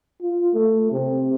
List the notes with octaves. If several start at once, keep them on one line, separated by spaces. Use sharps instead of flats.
F4
A3
C3